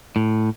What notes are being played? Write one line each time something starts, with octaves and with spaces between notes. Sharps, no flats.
A2